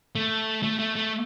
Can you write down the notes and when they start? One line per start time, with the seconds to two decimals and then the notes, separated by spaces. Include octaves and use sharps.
0.15 A3
0.63 A3
0.79 A3
0.96 A3